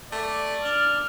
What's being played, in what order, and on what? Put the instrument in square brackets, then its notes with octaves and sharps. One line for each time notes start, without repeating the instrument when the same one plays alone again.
[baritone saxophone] A3 [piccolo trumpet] D5
[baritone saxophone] D4 [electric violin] F6